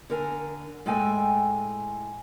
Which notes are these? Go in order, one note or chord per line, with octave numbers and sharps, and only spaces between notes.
D3 A#4 G#5
A2 G#3 A4 G5 G#5